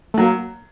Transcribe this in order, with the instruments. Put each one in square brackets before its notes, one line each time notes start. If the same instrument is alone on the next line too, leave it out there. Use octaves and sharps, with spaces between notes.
[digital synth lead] A3
[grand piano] F#3 [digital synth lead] A#3